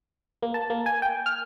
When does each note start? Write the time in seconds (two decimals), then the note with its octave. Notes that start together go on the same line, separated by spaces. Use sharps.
0.42 A#3
0.54 A5
0.70 A#3
0.86 G#5
1.02 G5
1.26 F6